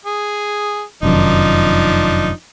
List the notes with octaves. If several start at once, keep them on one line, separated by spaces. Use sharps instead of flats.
G#4
F1 F#2 D#3 F3 D4 D#4